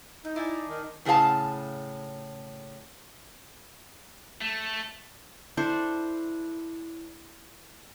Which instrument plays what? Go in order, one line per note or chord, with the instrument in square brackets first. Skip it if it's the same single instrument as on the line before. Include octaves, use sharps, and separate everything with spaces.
[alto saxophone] D#4 [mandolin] G6
[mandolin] D4 D5 G#5 [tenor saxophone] E4
[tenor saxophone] D#3
[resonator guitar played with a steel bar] A2 C#3 G#4 A#4 F5 A5
[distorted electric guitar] A3
[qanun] D4 E4 A4 C5